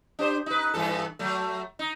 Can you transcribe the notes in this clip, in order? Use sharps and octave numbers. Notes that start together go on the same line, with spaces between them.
D4 G4 C5
D#4 B4
G2 E3 A4
F#3 A3
D#4